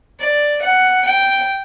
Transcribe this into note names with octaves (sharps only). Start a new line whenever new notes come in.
D5
F#5
G5